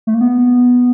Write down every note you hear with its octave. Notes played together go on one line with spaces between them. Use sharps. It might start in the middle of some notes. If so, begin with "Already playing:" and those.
A3
A#3
B3